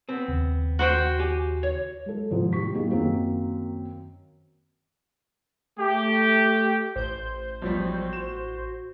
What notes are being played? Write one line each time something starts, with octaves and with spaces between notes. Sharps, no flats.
B3 C4
D#2 C#3
F#4 C5 G5
G4 G#5
C#5
G#3 A4
F2 G#2 C3 D#3 F3
A2 G4 C#6 B6
F#3 A#3 D#4 G4 G#4
F#2 D#3 A#3 C4 F#4
A3 G4
A1 C5 G6
B1 F3 G3 F#4
E7